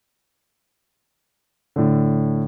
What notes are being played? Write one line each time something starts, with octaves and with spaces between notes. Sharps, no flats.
A2 D3